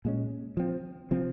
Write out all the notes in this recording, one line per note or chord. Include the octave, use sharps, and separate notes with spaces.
A#2 G#3 C#4
F3 C4
C3 F3 C4